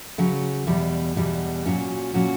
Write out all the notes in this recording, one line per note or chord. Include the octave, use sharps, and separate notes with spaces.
C#3 F#3 C#4
E2 B2 G3
E2 B2 G3
A#2 F#3 C#4 F#4
A#2 F#3 C#4 F#4